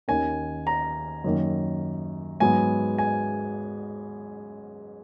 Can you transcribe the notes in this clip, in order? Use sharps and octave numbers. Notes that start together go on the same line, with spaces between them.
D#2 D#3 A#3 C#4 G#5
A#5
F#2 D#3 A#3
G#2 F#3 B3 G#5
G#5